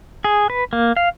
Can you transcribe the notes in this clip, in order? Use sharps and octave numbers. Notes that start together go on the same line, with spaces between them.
G#4
B4
A#3
F5